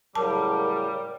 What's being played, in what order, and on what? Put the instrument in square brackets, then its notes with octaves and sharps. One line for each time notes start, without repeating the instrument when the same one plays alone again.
[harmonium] A2 C#3 F#3 [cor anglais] G3 [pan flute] A#4 [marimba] A5